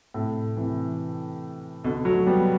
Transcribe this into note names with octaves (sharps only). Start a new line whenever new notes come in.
A2 C3
C3 E3
B2 D3
F#3 A3
G3 B3